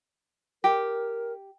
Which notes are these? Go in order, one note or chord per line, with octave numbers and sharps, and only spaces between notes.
G4 A#4